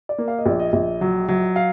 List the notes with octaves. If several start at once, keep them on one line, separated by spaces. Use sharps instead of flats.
D5
A#3
F5
D#5
A#1 D5
D#5
A#1
F#3
F#3
F5